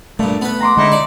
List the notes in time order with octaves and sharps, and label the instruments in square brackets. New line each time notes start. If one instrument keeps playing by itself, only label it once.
[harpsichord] G2 A#2 [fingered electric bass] A3
[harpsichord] B3 B4
[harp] A#5 C6 D6
[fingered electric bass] D3 G#3 [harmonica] D#4 E4
[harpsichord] D5